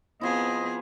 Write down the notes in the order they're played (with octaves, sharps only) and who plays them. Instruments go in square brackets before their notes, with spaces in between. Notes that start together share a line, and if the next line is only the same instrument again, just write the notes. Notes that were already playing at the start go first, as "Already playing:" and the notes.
[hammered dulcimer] F3 E4 [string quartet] B3 C4 G#4 [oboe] D#5